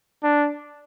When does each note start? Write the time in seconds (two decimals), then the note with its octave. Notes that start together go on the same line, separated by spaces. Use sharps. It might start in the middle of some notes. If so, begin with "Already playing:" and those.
0.23 D4